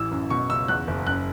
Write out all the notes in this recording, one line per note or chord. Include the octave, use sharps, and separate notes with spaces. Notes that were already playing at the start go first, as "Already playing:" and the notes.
Already playing: A1 E3 E6
F#2
B2 C#6
C#2 E6
E2 F#6
F#1
F#2 F#6